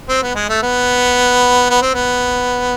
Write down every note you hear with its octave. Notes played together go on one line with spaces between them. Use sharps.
C4
B3
G#3
A3
B3
B3
C4
B3